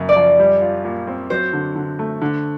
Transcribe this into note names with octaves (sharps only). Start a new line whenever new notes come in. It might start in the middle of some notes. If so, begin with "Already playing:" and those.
Already playing: F#2 C#3 A#3
D5
F3
G3
F4
A#2
C4
F#3 C5
D3
D3
A3
D3